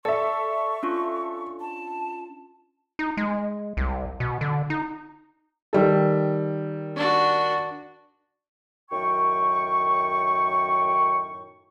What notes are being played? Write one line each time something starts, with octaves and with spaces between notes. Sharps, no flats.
A4 D5 E5 C#6
C#4 D4 F4
A5
D#4
G#3
C2
B2
D3
D#4
D#3 G3 A4
D4 F#4
F#2 A2 D#3 G5 C#6